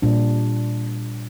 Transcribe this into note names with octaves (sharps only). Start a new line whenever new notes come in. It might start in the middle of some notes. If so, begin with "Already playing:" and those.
A#2 G3 D4